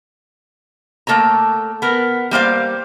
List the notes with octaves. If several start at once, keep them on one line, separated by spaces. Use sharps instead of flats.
A3 A#3 A4 C#5 A#5
B3 A#4
G3 A#3 C5 F5